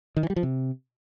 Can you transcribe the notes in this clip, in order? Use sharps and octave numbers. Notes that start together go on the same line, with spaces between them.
D#3
E3
G3
F3
C3